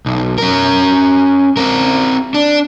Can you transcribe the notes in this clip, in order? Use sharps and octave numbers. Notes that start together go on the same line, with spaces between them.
B1
C#4 A#4
C4 A#4
D4